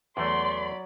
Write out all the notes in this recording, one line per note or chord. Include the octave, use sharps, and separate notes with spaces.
E2 F#3 A3 D5 B5 C6